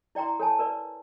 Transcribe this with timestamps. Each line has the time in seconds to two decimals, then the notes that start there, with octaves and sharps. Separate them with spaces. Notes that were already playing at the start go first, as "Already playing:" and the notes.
0.15 E4 D5 G5 A#5 C6
0.39 A4 C#5 G#5 A5
0.59 A#4 B4 D5